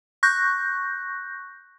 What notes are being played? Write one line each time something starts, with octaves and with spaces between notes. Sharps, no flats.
C#6 F#6 G6 A#6